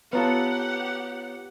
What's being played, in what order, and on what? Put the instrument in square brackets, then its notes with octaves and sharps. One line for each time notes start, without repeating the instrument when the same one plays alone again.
[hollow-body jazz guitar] B3 F4 A4 [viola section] G4 F#5 [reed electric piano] B4 C#5 A#5